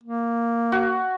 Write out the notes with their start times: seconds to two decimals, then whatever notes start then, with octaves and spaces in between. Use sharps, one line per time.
0.04 A#3
0.72 F#4